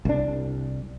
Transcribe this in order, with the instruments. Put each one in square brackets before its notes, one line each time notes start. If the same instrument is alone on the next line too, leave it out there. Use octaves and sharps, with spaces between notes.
[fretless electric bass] C2 D4